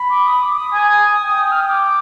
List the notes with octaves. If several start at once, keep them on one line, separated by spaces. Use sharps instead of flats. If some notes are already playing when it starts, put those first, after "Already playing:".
Already playing: B5
D6
D#6
D6
D#6
G#5
G5
F6
D#6
D6